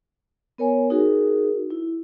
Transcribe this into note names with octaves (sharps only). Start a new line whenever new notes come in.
B3 A#4 C#5 G#5
D#4 F#4 G#4 A#4
E4